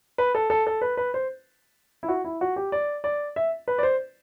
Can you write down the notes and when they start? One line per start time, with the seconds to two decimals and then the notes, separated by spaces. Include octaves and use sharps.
0.18 B4
0.35 A4
0.50 A4
0.67 A4
0.81 B4
0.97 B4
1.14 C5
2.03 E4
2.08 F#4
2.25 E4
2.41 F#4
2.56 G4
2.72 D5
3.04 D5
3.36 E5
3.68 B4
3.78 D5
3.83 C5